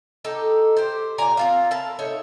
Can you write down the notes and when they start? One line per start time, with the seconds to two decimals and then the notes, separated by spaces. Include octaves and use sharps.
0.25 D#4 G4 A4
0.77 G4 C5
1.18 A#2 D5 G#5 A#5
1.37 C4 F4 F5
1.71 E4 A#4 A5
1.99 A3 D#4 C#5